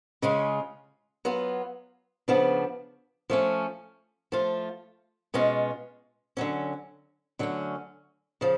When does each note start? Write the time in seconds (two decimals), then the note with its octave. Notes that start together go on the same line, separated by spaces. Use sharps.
0.22 C#3 G#3 C#4 F4
1.25 F#3 B3 F4
2.28 C#3 F3 B3 D4
3.30 F3 A3 C#4
4.32 F3 A3 F4
5.34 B2 G#3 C#4 F4
6.37 D3 F#3 C#4
7.39 D3 F#3 A3 C#4
8.41 C#3 F3